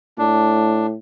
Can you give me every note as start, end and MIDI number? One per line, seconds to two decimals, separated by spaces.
0.18 0.95 45
0.18 0.87 62